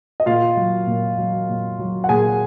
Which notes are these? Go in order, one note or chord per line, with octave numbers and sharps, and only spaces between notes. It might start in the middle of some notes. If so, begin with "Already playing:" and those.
D#5
A#2 F4 F5
F#3
A#2
F#3
A#2
F#3
F#5
A#2 G#4 G#5